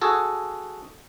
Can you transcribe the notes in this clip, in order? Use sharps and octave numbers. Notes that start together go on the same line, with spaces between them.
F#4 G#4 A4